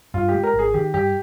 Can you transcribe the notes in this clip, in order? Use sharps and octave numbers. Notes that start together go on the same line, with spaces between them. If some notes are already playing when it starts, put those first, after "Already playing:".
G2 F4
G4
G#3
A#4
G#1
G#4
D#3 G4
G2 G4